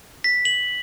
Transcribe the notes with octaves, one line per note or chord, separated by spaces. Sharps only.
B6
F#7